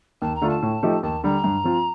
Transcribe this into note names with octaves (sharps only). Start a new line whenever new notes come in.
D#2 A5
A#5
D3 A3 D4 F4
A5
A2
F3 A3 D#4 G4
D#2 A5
D3 G3 A#5
G2
F3 C4 F4